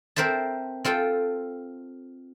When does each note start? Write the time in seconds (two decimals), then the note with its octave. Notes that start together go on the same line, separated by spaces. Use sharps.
0.16 C4 A#4 C5 E5 A5
0.84 C4 F4 A4 G5